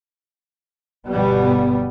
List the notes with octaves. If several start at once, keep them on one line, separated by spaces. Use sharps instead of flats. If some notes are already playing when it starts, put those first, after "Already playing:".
G1 B2 G3 B3